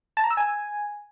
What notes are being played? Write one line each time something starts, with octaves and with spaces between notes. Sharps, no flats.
A5
A#5
E6
G#5